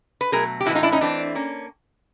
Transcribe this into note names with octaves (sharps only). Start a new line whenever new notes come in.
B4
B2 F#3 A3 G#4 A#4
G4
A2 E3 G#3 B3 E4 F#4
D#4 F4
D4 E4
C#4 D#4
E3 A3 C4 D4
A#3 C#4